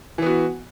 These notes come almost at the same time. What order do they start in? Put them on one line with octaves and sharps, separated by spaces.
E3 B3 F#4